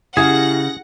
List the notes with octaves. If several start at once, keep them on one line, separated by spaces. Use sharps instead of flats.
C#3 E4 G4 G#4 F#5 A#6